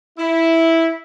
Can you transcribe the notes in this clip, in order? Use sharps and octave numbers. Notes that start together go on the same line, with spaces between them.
E4